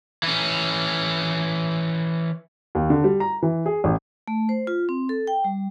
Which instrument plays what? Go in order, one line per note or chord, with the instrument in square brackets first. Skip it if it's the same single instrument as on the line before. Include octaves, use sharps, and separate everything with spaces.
[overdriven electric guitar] E3 C#4
[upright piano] D#2
D3
G3
A#5
E3
G#4
A1
[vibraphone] A3
C5
F4
C4
A4
G5
G3